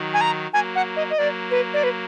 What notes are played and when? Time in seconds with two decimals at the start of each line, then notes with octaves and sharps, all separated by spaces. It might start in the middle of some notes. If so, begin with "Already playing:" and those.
Already playing: D#3 F#3
0.14 G#5
0.21 A#5
0.53 F#3 A#3 G#5
0.76 F#5
0.96 D#5
1.10 D#5
1.18 F#3 A#3 D5
1.51 B4
1.74 D5
1.84 B4